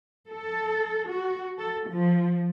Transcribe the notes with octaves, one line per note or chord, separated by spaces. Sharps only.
A4
F#4
A4
F3